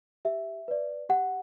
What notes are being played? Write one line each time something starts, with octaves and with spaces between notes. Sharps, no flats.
G4 E5
B4 D5
G4 F#5